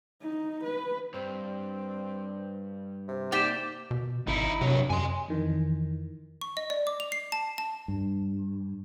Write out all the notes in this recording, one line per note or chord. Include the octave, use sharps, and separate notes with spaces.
D#4
B4
G2 C4
C3
A#3 D#4 G4 D5 G5 B6 E7
B2
G#1 D#4 E4
G2 C3 F#3
F#2 G#5 C6
F2 D#3 E3
C#6
D#5
D5
D6
F7
C7
A5
A5
G2